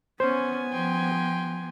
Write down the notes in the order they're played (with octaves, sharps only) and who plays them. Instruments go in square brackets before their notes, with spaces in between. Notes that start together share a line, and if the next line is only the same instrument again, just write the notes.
[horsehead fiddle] B3 G#5 [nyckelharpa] C#4 [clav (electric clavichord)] C5
[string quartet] F3 [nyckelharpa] G5 C6